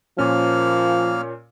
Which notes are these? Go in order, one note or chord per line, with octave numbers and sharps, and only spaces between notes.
A#2 F3 A#3 C#4 F6